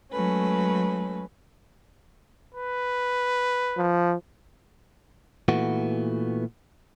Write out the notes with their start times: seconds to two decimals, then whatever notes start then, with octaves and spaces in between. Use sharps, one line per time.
0.12 F#3 G#3 A3 C#4 B4
2.55 B4
3.77 F3
5.48 A#2 E3 A3 B3 F#4